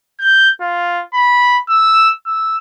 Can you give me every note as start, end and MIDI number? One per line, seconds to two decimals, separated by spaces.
0.20 0.49 91
0.61 1.02 65
1.14 1.59 83
1.69 2.11 88
2.26 2.57 88